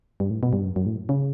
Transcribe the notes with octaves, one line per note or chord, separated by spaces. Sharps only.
G2
A2
B2
G2
F#2
F#2
A2
C#3